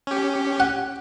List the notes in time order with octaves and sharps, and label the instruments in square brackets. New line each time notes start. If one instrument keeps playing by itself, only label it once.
[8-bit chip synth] C#4 G4
[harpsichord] F#5